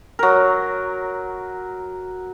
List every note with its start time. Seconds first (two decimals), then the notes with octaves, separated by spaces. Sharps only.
0.19 F#3 A#4